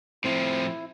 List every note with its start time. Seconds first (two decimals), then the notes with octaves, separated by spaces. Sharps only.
0.24 A2 F3 C4 E4